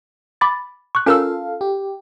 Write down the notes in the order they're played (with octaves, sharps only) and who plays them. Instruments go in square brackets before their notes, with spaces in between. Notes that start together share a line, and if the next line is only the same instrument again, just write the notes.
[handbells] B5 D6 A6
C#6 F#6
[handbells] C#4 A#4 E6 [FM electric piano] F4 A4 F5
[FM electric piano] G4